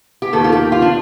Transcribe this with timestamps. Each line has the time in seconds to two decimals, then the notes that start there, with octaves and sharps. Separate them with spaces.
0.22 G4
0.33 D#2 D#3 A#3 A4
0.44 F4
0.52 G4
0.72 F4
0.82 D4